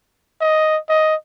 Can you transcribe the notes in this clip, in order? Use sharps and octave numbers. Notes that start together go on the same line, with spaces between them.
D#5
D#5